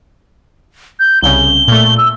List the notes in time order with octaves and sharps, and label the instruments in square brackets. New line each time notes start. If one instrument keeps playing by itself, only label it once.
[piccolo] G6
[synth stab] C2 C#3 [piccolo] G7
[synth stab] A#2 A3
[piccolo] E6